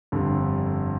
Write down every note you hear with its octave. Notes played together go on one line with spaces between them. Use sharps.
G1 F2 D3 G3